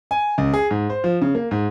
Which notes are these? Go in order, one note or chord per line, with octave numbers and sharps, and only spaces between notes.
G#5
C#2
G#4
G#2
C5
F3
C#3
A#3
G#2